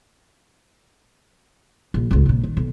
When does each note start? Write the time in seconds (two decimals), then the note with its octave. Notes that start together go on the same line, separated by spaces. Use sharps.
1.94 A#1
2.11 D1 C#2
2.26 A#1 A#2
2.43 D#3
2.57 B1